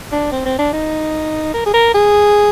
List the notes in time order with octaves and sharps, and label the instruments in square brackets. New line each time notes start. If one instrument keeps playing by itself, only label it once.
[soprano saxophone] D4
C4
C4
D4
D#4
A#4
G#4
A#4
G#4